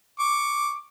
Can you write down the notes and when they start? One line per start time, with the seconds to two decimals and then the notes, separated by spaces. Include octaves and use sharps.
0.19 C#6 D6